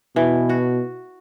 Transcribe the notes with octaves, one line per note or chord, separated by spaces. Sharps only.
B2 E3
F#4